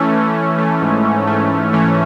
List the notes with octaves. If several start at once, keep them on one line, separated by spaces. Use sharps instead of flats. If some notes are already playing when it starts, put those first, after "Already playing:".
Already playing: E3 A3 C#4
E3
A3
A3
G#2
G#2
A3
G#2
E3 A3 C#4